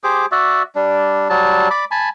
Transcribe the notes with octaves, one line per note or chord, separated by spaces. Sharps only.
G4 G#4 C5 D6
F#4 D5 E5
G3 D4
F#3 G3 A5
D5 B5 D6
G#5 A5 B5